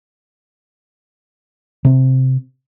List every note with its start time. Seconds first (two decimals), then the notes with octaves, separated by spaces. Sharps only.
1.85 C3 C4